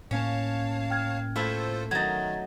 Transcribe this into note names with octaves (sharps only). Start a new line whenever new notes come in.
A2 A#3 C#4 C#5 F5 A5
G5 F6 G#6
A3 E4 F4 A4 C5
D#3 F#3 D#4 G#6 A6